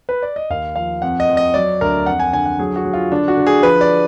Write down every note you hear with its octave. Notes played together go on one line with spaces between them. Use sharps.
B4
D5
D#5
D#2 F5
F3 F5
F2 F#5
D#5
F2
D#5
F#3 D5
D2 A#4
F2 F#5
G#5
D3 G#5
F#5
F#3 G#4
F#4
F#3
F4
D3 D4
F#4
D3
G#4
F3 B4
D5